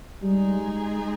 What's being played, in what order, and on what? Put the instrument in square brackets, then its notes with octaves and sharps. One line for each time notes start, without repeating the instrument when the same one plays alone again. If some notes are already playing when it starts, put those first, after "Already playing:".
[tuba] G3 [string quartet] G#3 D#4 G#4